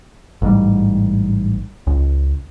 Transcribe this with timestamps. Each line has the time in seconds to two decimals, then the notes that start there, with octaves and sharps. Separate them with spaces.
0.42 A1 G#2 G3
1.87 C#2